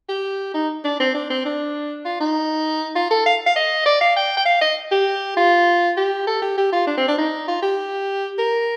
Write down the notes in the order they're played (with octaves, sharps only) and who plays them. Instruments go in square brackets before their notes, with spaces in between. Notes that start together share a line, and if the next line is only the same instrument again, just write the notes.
[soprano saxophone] G4
D#4
D4
C4
D4
C4
D4
F4
D#4
F4
A4
F5
F5
D#5
D5
F5
G5
G5
F5
D#5
G4
F4
G4
A4
G4
G4
F4
D4
C4
D4
D#4
F4
G4
A#4